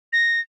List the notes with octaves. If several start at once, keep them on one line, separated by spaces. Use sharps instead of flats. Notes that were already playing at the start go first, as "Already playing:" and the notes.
A#6